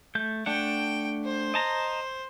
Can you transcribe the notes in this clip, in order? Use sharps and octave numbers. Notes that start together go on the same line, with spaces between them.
A3 G6
A3 D4 F#5 G5
C5
D#5 A5 A#5